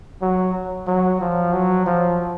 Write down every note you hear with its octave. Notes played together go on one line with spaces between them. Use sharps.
F#3
F#3
F3
F#3
F3